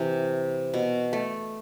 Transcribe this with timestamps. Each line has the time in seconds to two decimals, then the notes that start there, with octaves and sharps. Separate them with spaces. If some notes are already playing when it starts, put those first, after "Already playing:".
Already playing: C3 E3
0.74 B2
1.13 A3